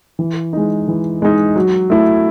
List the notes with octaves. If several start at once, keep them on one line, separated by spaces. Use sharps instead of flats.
E3
G#3 D#4
E3
G#3 D#4
F#3
A3 E4